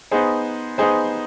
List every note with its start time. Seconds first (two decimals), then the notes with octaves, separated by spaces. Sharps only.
0.11 B3 D#4 G#4 C5
0.78 B3 D#4 G#4 C5